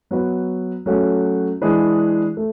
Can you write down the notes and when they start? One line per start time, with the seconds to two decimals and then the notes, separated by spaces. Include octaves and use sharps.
0.11 F#3 B3 F#4 B4
0.86 F#3 A3 C#4 F#4
1.61 E3 G#3 D4 G#4 B4
2.37 A3